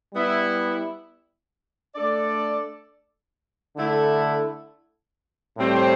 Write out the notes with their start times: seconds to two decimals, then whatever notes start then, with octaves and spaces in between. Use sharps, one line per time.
0.14 G3 B3 E4
1.95 A3 D4 A4 D5
3.76 D3 A3 E4 A4
5.58 A2 G3 C4